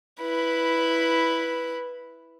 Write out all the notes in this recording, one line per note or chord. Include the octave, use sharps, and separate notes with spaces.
E4 B4